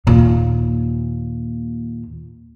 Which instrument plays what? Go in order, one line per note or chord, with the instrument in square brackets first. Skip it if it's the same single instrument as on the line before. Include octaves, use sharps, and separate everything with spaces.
[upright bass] D#2 A#2